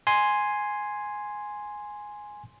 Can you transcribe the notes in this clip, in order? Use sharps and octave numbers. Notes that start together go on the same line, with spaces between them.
G#5 C6